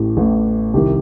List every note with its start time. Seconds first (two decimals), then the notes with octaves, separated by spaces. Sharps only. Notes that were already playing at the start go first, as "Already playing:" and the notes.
Already playing: A1 A2 G4
0.17 A1 A2
0.74 C2 C3 D#3 G4